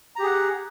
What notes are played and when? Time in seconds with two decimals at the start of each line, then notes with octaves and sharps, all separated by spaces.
0.16 A#5
0.19 G4
0.23 G#4
0.26 F#5